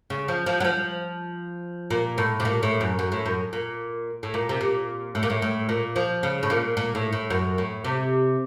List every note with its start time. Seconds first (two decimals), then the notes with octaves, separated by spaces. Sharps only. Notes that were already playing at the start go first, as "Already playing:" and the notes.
0.10 C#3
0.28 F3
0.46 F3
0.60 F#3
0.65 F3
1.91 A#2
2.18 A2
2.40 C3
2.45 A#2
2.63 A2
2.81 F#2
2.99 F#2
3.12 A2
3.26 F#2
3.53 A#2
4.23 A2
4.34 A#2
4.49 C3
4.61 A#2
5.15 A2
5.23 A#2
5.30 A2
5.42 A2
5.69 A#2
5.96 F3
6.23 C#3
6.43 A2
6.50 A#2
6.77 A#2
6.95 A2
7.13 A2
7.30 F#2
7.58 A2
7.84 C3